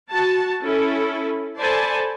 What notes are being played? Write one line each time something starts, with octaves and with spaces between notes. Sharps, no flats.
F#4 A5
C#4 E4 A4
A4 C5 D5 G#5 A5 B5